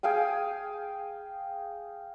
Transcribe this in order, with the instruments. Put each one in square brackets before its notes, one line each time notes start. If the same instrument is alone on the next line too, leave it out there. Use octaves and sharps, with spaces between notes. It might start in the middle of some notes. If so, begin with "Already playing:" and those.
[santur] G#4 F5 G5 G#5